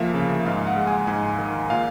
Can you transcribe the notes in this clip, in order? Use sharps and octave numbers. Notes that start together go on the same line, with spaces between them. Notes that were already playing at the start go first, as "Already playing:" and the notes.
Already playing: D2 F3 A#3 E5 F5
C#3
G#2 F5
F#5
G#3
G#5
G#2 G#5
D#3
A#2 F5